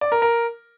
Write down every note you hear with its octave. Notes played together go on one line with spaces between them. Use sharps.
D5
A#4
A#4